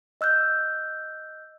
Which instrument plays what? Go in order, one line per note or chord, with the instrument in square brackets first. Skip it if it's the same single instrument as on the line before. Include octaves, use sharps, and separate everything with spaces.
[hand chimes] D#5 E6 F#6 G6